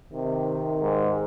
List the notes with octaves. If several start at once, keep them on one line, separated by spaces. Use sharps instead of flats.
C3 D#3
G#2